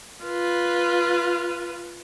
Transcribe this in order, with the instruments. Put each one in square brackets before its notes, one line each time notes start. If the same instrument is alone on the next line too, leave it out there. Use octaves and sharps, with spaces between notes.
[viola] F4 B4